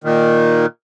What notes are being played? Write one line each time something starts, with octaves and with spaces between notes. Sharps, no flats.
A#2 D#3